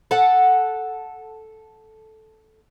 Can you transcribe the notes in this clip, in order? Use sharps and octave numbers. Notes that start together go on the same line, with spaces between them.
A4 F#5